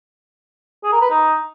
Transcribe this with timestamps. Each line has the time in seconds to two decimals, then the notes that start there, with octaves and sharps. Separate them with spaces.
0.84 G#4
0.92 A#4
1.01 B4
1.10 D#4